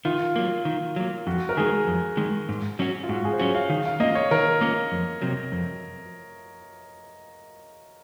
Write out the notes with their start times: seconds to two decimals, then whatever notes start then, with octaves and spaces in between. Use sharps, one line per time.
0.05 D#3 F4
0.36 F#3 A#3
0.65 D#3
0.96 F#3 A#3
1.27 F2 F#4
1.49 A#4
1.57 D#3 G#3 G#4
1.87 F2
2.17 D#3 G#3
2.49 G#2
2.79 F#3 C#4 F#4
3.03 F4
3.09 G#2 F#4
3.25 G#4
3.33 C5
3.39 F#3 C#4 F#4 C#5
3.55 F5
3.70 D#3
3.86 F5
4.00 A#3 C#4 F4 D#5
4.15 C#5
4.31 D#3 A#4
4.61 A#3 C#4 F4
4.92 F2
5.22 C3 F#3
5.52 F2